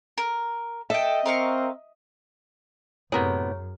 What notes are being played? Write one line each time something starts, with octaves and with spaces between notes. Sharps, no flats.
A#4
A4 D#5 E5 G5
C4 A#4 F5 C#6
F#2 A2 C3 B3 G#4 A#4 C#5